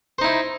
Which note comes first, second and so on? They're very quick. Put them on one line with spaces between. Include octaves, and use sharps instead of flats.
C5 D#4 E4